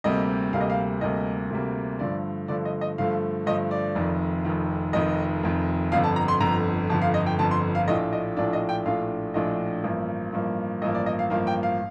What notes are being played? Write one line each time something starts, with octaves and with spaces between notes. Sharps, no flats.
D2 C3 G3 A#3 D#5
D2 C3 G3 A#3 F5
D#5
F5
D2 C3 G3 A#3 D#5
D2 C3 G3 A#3
G2 D3 F3 A3 D5
G2 D3 F3 A3 D5
D#5
D#5
G2 D3 F3 A3 F5
G2 D3 F3 A3 D#5
D5
F1 F2 D#3
F1 F2 D#3
F1 F2 D#3 D#5
F1 F2 D#3
G1 F2 D3 F5
A5
A#5
C6
G1 F2 D3 A#5
G1 F2 D3 A5
F5
D#5
G5
G1 F2 D3 A5
C6
F5
A#1 A2 A3 D4 F4 D#5
D#5
A#1 A2 A3 D4 F4 D5
D#5
G5
A#1 A2 A3 D4 F4 F5
A#1 A2 A3 D4 F4 D#5
A1 G2 F3 A#3
A1 G2 F3 A#3
A1 G2 F3 A#3 D#5
D5
D#5
F5
A1 G2 F3 A#3 F5
G5
F5